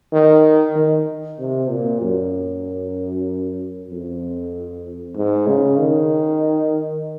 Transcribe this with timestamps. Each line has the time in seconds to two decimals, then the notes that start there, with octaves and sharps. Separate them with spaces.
0.13 D#3
0.76 D#3
1.39 C3
1.70 A#2
2.01 F#2
3.90 F2
5.16 G#2
5.47 C#3
5.79 D#3